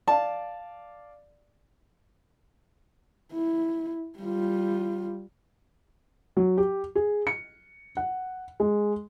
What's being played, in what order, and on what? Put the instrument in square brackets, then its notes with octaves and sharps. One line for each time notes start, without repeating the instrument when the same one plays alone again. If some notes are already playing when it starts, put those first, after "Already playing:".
[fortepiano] D5 F5 [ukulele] A5
[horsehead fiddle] E4
G3 F4
[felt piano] F#3
G4
G#4
C#7
F#5
G#3